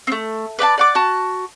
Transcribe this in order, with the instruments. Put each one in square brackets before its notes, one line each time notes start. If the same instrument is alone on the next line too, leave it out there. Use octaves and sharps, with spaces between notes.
[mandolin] A3 C4
B4 D5 G5 A5
D5 F#5 D6
F#4 A5